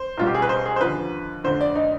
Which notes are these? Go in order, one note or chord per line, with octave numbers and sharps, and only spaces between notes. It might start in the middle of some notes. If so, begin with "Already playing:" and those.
Already playing: C5
B1 B2 G3 F4
G4
G#4
B4
C5
G#4
C5
D#2 D3 F3 B4
F1 F2 D3 C5
D5
D#4